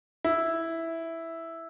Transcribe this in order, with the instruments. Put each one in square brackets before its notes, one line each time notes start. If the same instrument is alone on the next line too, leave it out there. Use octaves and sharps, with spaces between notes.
[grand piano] E4